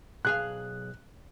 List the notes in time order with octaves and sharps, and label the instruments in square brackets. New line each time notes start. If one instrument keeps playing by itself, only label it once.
[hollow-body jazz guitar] B1 G#4 F5 [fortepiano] F#6